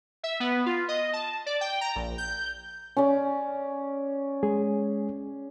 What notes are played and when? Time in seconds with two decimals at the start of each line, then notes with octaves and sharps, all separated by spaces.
0.24 E5
0.40 B3
0.66 F4
0.88 D#5
1.13 A5
1.46 D5
1.61 G5
1.81 A#5
1.96 A#1
2.18 G6
2.97 C#4 D5
4.43 G#3 G#4